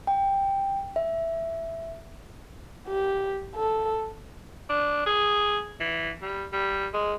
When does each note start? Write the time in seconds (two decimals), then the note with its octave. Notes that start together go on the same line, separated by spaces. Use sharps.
0.07 G5
0.96 E5
2.88 G4
3.56 A4
4.70 D4
5.07 G#4
5.80 E3
6.22 G3
6.53 G3
6.94 G#3